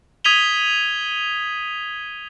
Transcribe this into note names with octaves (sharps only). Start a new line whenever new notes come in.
D#6 G#6 B6 D#7 F7 G7